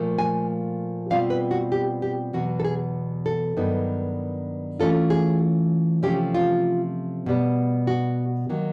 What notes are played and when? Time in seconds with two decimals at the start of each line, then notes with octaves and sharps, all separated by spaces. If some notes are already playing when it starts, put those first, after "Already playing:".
Already playing: A#2 F3 A3
0.19 G#5
1.10 B2 G3 C4 F4 F5
1.30 B4
1.51 F#4
1.72 G4
2.02 G4
2.33 E2 B2 F#3 F#4
2.60 A4
2.65 G#4
3.26 A4
3.57 G2 D#3 F#3 B3 D#4
4.80 E3 A3 C#4 F4 A4
5.10 G#4
6.03 C3 F3 A3 C#4 G4
6.35 F4
7.26 B2 G3 B3
7.87 F#4
8.49 D#3 F#3 A#3